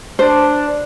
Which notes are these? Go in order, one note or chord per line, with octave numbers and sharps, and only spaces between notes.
D4 C5